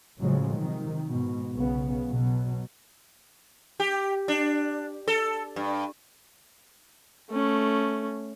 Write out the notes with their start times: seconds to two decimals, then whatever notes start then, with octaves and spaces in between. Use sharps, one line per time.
0.20 A2 C#3 F3 F#3 G#3
0.54 C3 D#3
1.08 G#2 B2
1.54 B1 C#3 B3
2.10 B2 F#3
3.80 G4
4.28 D4
5.08 A4
5.56 G2
7.30 A3 C#4